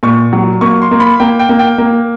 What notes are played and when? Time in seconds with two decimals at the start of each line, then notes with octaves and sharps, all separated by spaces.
0.03 A#2 C#6
0.33 F#3
0.61 A#3 C#6
0.82 C6
0.91 A#3
1.00 B5
1.20 A#3 G5
1.39 G5
1.49 A#3
1.59 G5
1.78 A#3